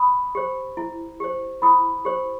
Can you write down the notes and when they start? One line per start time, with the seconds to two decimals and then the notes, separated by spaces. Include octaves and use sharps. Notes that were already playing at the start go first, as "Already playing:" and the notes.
Already playing: B5 D#6
0.35 G4 C5
0.77 E4
1.20 G4 C5
1.62 E4 B5 D#6
2.05 G4 C5